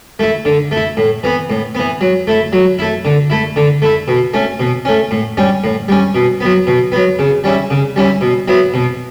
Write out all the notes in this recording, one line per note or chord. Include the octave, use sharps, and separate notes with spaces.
A3 E4
D3
A3 E4
A2
E3 B3
A2
E3 B3
F#3
A3 E4
F#3
A3 E4
D3
A3 E4
D3
A3 E4
B2
A3 C#4
B2
A3 C#4
A2
G3 C#4
A2
G3 C#4
B2
F#3 B3
B2
F#3 B3
C#3
G3 C#4 E4
C#3
G3 C#4 E4
B2
F#3 B3 E4
B2